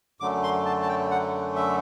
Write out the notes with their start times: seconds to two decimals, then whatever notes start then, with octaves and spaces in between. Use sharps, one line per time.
0.20 F#2 D3 F#3 A3 D6
0.43 C6
0.66 A5
0.82 A5
0.88 G5
1.11 F#5
1.56 E5